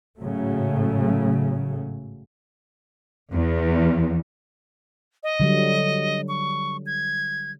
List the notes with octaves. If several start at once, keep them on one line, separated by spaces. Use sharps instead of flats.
A1 G#2 C#3 F#3 A3
E2
D#5
D3 F#3 G3
C#6
G#6